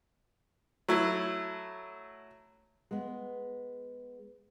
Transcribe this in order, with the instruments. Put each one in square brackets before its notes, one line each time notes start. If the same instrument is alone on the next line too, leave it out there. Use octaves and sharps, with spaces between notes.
[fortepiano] F#3 A3 E4
[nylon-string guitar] G#3 B3